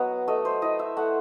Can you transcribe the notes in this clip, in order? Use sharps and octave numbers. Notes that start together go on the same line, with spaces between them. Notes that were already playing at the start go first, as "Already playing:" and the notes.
Already playing: F#3 B3 D#5 F#5
A3 D#5
C5
E4 D#5
E5
A3 F#5